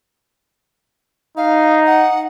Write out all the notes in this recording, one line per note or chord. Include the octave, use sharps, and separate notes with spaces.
D#4 F5
F#5